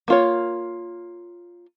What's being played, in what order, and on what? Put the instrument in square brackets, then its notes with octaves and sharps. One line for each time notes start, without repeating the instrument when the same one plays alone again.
[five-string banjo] A#3 F4 C#5